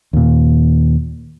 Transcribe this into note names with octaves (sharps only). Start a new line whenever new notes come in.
D#2 A#2